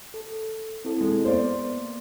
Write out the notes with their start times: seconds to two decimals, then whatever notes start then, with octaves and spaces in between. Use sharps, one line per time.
0.14 A4
0.85 C4 E4 A4
1.01 G#3
1.25 A#3 B3 C5 D5